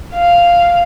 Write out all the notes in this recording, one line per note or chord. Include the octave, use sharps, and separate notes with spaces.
F5